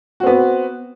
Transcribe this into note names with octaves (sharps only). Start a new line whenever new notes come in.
B3 C4 F#4